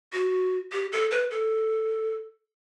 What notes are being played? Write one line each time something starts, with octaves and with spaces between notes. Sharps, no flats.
F#4
G4
A4
B4
A4